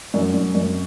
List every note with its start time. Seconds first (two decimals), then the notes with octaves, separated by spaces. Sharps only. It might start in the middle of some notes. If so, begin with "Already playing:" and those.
0.14 F#2
0.34 F#2
0.55 F#2